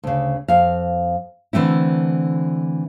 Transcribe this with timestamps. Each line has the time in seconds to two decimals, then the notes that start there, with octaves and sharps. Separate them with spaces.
0.04 D2 C#3
0.48 F2 F5
1.53 D3 E3 A3 C4 E4